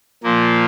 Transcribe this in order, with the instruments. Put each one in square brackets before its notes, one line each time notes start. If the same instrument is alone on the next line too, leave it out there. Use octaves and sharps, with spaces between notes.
[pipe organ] A#2 F3 A#3